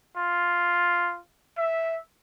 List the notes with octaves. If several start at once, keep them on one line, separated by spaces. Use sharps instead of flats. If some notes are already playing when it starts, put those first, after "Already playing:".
F4
E5